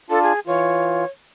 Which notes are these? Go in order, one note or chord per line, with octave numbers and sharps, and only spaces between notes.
D4 F4 A4 A5
G#4
E3 F4 C#5